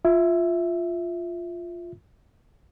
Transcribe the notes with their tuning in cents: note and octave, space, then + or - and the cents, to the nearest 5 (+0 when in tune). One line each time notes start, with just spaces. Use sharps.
F4 +0 E5 +0